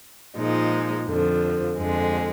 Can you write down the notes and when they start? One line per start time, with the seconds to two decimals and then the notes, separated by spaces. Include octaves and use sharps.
0.36 A#2 F3 G#3 D#4
1.07 F2 D3 F3
1.77 F2 D3 G#3